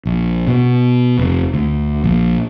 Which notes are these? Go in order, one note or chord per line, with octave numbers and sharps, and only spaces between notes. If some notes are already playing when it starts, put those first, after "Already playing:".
A#1
B2
F1
D2
A#1